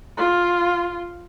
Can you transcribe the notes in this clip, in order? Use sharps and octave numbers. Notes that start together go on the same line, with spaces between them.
F4